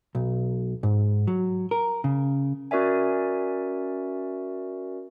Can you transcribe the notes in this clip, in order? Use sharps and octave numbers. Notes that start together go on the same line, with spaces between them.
B1
G#2
F#3
A#4
C#3
C#4 F#4 A#4 D5 E5 G#5